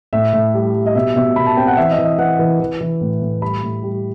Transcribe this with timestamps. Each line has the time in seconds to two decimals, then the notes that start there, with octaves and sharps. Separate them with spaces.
0.13 A2 E5
0.33 A2
0.54 G3
0.74 G3
0.86 D#5
0.95 B2 E5
1.16 B2 E5
1.36 B2 B5
1.46 A5
1.57 C4 G5
1.67 F#5
1.77 E3 E5
1.91 D#5
1.98 E3
2.05 D#5
2.18 E3 F#5
2.39 E3
2.60 E3
2.81 E3
3.01 A2
3.22 A2
3.42 G3 B5
3.63 A2
3.83 G3